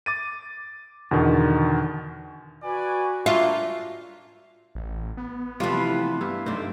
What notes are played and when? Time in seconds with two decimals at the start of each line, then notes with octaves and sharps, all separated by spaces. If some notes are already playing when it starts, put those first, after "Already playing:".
0.06 D6 A6 D#7
1.11 E2 B2 D3 D#3
2.63 F#4 B4 D5 G#5
3.26 A3 A#3 D4 F4 E5
4.75 A1
5.17 B3
5.60 C3 E3 F3 G3 A3 F4 B4
6.21 G2 E4
6.46 F#2 A3 C4 C#4 D#4 C5 D5